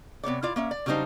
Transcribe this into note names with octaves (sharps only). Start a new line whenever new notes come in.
C3 B3 C#5 D5
E4 F4 D5
A#3 C#4 E5
D5
C#3 F#3 G3 D4 D#4 C5